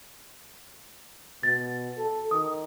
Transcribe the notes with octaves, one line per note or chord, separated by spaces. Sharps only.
B2 A6
A4
D#3 D#6